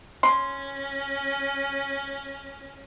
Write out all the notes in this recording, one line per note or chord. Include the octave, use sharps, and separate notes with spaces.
C#4 C6